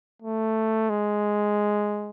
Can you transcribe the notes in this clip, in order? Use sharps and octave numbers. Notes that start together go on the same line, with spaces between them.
A3
G#3